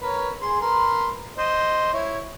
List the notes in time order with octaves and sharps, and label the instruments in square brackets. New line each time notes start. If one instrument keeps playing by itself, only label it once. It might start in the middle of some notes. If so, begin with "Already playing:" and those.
[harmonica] A#4 B4 C#5
G#4 C6
A#4 B4 C6
C5 D#5
E4 C#5